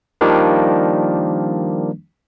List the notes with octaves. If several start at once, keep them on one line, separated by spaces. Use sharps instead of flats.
D#3 F3 G3 A#3 D4